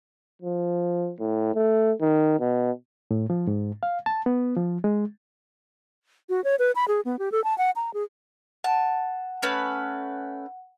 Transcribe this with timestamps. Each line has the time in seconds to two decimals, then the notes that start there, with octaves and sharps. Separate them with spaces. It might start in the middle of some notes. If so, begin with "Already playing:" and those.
0.42 F3
1.19 A2
1.55 A3
2.01 D#3
2.39 B2
3.11 A2
3.30 F3
3.47 G#2
3.83 F5
4.06 A5
4.26 B3
4.57 F3
4.84 G#3
6.29 F#4
6.44 C#5
6.59 B4
6.75 B5
6.88 G#4
7.05 B3
7.19 G4
7.32 A4
7.44 A5
7.58 F#5
7.76 A#5
7.94 G#4
8.64 F#5 A5
9.42 A3 C#4 B4